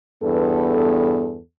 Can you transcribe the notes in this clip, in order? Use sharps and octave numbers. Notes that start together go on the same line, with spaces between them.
E2 G2 B3 A4